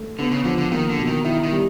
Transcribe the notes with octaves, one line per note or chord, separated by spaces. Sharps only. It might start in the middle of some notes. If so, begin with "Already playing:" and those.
Already playing: A3
D3 B3
C#3
D3 F3
D3
D#3 A#3
D3
B2
D#3
D#3 E4
D#3
G3